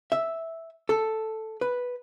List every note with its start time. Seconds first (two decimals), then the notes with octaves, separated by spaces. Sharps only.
0.12 E5
0.89 A4
1.61 B4